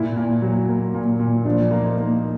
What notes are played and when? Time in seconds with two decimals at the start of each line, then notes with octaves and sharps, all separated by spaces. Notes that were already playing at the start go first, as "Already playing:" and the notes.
Already playing: A#2 E4
0.16 A#2
0.42 F#3
0.69 A#3
0.95 A#2
1.20 A#2
1.45 F3 D4
1.71 A#3
1.84 D#4
1.97 A#3